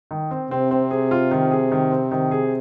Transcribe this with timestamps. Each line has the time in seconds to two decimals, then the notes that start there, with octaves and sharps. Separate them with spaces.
0.11 D#3
0.31 C4
0.50 C3 C4
0.71 C4
0.91 G#4
1.11 F4
1.31 D#3
1.51 G#4
1.72 D#3
1.92 C4
2.11 D#3
2.31 G#4